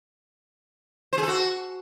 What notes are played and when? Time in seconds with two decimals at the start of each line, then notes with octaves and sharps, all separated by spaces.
1.13 C5
1.18 G#4
1.23 A4
1.28 F#4